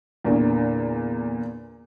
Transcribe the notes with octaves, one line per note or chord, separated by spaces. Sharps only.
E2 A#2 D3